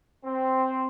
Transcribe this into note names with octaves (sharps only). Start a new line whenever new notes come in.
C4